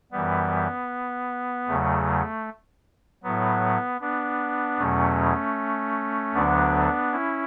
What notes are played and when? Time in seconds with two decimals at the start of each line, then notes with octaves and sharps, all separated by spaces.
0.12 F#2 E3 G3 B3
1.68 E2 C#3 F#3 A3
3.23 A2 F#3 B3
4.01 B3 D4
4.79 E2 B2 F#3 A3 C#4
6.34 D2 D3 F#3 B3 D4
7.12 C#4 E4